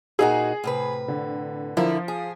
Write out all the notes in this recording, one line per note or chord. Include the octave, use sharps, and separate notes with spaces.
A#2 D#4 F#4 G#4
A2 C3 B4
D3
D3 F3 E4 A#4
G#4